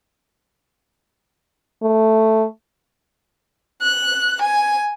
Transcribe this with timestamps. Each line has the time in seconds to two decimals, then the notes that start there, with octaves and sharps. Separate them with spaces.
1.83 A3
3.82 F#6
4.42 G#5